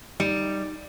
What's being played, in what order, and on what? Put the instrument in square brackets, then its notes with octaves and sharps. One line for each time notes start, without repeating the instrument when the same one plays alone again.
[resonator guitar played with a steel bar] G3 [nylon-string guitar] D#4